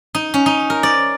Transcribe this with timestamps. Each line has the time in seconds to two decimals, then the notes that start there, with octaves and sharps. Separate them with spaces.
0.15 D#4
0.34 C#4
0.46 D#4
0.70 A#4
0.83 D5